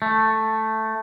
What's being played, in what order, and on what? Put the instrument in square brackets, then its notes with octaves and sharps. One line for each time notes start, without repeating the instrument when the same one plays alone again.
[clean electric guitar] A3